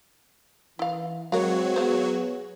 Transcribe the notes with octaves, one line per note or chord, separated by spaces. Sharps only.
E3 E4 F5
F#3 G#3 C4 F#4 A#4 C#5 F5
B3 G#4 C5 F5